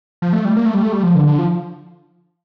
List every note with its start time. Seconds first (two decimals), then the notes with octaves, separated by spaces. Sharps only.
0.22 F3
0.33 A3
0.45 G3
0.57 A#3
0.65 A3
0.75 G3
0.83 A3
0.92 G3
1.03 F3
1.15 D3
1.27 D3
1.38 F3